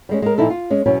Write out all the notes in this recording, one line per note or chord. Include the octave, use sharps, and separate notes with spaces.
G3 G#3 C#4
G#3 A#4
A#2 F3 D#4 E4 A4
F4
G#3 C#4
E2 B2 F#3 C#4